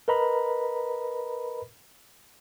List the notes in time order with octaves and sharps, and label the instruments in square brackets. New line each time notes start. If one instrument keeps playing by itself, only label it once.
[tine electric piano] A#4 B4 D#5 A#5 B5